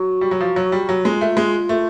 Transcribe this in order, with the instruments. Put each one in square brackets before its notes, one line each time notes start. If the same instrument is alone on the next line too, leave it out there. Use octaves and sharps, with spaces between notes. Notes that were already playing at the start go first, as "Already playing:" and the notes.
Already playing: [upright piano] F#3 [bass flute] F#4
[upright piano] G3
F#3
F3
F#3
G3
F#3
[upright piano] G#3 [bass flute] F4
[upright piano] A3
G#3
A3